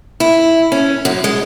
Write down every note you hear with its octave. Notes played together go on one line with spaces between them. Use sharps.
E4
C#4
F#2
G#3